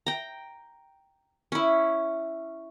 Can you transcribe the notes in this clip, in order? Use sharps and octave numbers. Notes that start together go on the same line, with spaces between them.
G5 A#5
C#4 E4